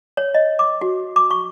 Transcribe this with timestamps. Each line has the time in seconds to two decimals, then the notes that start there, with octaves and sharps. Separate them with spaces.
0.17 C#5
0.34 D#5
0.59 D6
0.81 F#4
1.16 D6
1.31 C#6